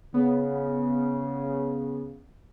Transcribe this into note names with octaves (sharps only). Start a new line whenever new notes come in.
C#3 B3